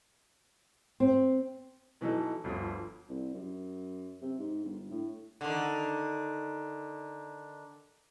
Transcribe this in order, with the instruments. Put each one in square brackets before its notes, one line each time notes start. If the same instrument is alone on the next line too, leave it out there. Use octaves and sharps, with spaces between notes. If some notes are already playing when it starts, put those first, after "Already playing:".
[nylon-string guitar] C4
[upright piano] B2 E3 F#3 D#4 A4
G1 D2 F3 D#6
[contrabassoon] C2
F#2
C3
G#2
G1
A2
[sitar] D3 D#3